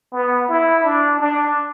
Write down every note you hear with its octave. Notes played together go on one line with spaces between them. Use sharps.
B3
E4
D4
D4